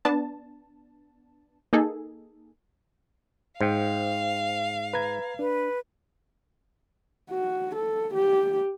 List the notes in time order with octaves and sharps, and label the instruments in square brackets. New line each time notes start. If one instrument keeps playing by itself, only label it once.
[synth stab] B3 D4 A5
A#3 D#4 G#4 A4
[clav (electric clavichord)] G#2 [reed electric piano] C5 G5 [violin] F5
[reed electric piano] B4 A#5 G#6
[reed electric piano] D4 [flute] B4
[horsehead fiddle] F#4
A4
G4